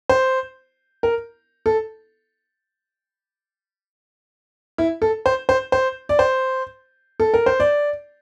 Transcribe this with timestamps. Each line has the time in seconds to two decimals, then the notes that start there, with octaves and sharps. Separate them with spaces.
0.09 C5
1.03 A#4
1.66 A4
4.78 E4
5.02 A4
5.26 C5
5.49 C5
5.72 C5
6.09 D5
6.19 C5
7.20 A4
7.34 A#4
7.46 C5
7.60 D5